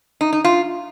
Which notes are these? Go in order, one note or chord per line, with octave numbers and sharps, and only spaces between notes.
D#4
D#4
F4